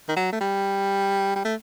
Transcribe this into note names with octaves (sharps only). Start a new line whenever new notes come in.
D#3
F#3
A3
G3
G3
A3